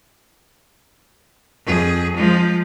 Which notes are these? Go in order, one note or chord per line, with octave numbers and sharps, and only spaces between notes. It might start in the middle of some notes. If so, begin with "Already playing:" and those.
F2 G#4
F3 G#3